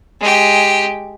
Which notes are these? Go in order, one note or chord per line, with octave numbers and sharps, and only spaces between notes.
G#3 G4